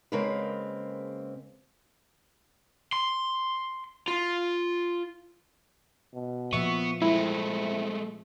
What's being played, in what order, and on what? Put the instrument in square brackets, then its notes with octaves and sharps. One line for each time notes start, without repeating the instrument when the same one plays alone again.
[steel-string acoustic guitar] C#3 G#3 A#3 C4 A#4 B4
[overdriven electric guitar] C6
F4
[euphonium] B2
[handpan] A#2 F3 E5 [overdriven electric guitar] B3 [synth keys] C#6
[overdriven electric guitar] G#3 A3 [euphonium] C4 [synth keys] E4